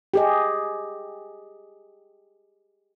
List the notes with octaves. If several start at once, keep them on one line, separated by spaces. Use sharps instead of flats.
G4 G#4 D#5